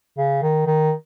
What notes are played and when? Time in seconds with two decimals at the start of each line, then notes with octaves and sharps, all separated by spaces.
0.18 C#3
0.42 D#3
0.67 D#3